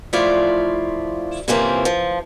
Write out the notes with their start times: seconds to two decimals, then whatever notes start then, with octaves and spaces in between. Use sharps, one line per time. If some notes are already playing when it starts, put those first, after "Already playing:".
0.13 F3 A3 E4 F4 D5 F5
1.48 C3 E3 F3 A#3 C4 C#4
1.85 F3